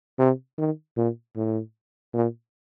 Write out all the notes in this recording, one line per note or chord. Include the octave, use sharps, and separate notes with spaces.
C3
D#3
A#2
A2
A#2